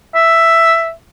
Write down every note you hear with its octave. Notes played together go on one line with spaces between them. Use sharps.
E5